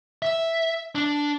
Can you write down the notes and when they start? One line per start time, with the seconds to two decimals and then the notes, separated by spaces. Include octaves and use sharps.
0.22 E5
0.95 D4